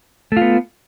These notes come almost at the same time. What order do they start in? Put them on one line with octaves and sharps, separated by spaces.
A3 F4 B3